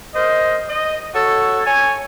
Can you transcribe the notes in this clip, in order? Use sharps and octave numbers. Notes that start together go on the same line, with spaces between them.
A#4 C5 D#5
D#5
F#4 A4 C#5
C#5 G#5